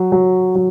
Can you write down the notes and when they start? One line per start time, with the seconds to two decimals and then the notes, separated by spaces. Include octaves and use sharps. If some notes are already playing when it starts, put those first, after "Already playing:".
Already playing: F#3
0.12 F#3
0.55 F#3